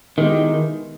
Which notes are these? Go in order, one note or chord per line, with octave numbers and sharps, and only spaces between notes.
B2 D#3 G#3 B3 E4 G4